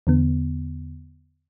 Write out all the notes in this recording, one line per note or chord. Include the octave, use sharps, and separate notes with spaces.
E2 D3 B3